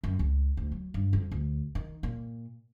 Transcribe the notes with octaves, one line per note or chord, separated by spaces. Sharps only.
F#2
C#2
D2
F#3
G2
F2
D2
D#3
A#2